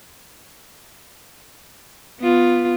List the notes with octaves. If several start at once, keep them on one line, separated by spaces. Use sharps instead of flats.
B3 F4